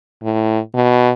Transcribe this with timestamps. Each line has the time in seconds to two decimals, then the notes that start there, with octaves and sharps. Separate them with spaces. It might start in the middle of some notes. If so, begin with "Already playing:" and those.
0.23 A2
0.75 B2